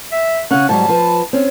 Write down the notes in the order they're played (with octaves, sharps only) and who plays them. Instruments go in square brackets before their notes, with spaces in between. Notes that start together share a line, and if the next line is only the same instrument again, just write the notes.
[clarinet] E5
[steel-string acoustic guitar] C#3 C#4 [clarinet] F#5
[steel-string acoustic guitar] G#2 F#3 G3 [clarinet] A5
[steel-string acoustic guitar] F3 B4
C4 C#4